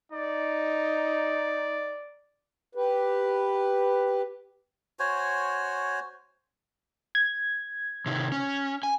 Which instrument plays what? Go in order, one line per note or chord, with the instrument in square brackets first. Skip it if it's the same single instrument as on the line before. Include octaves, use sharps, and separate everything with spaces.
[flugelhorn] D#4 [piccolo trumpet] D5
[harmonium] G4 B4
[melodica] F#4 C5 C#5 G#5
[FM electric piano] G#6
[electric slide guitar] C3 D#3
C#4
G#5